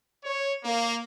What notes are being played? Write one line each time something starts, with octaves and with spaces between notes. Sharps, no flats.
C#5
A#3